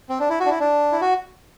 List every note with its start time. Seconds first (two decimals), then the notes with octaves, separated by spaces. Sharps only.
0.09 C4
0.20 D4
0.30 E4
0.40 F#4
0.46 D4
0.50 E4
0.60 D4
0.92 E4
1.01 F#4